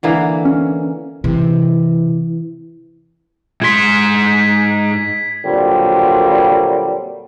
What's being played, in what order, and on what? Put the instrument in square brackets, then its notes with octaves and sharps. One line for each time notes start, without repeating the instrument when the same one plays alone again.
[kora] D3 E3 A#3
[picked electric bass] C#4
[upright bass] C3 [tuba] E3
[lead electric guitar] G#2 C6 [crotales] G#6 B6
[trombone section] A#2 D3 F#3 G3 C4